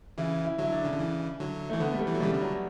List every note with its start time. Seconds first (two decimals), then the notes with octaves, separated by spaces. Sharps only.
0.18 C#3 E3 E4
0.45 E4
0.58 D3 F#3 E4
0.72 D4
0.85 C#3
0.92 D3
0.99 C#3 E3
1.40 D3 F#3
1.70 E3 A3
1.80 D3 B3
1.94 G3
2.00 A3
2.07 E3
2.15 F#3
2.20 C#3 E3 G3
2.34 D3
2.41 F#3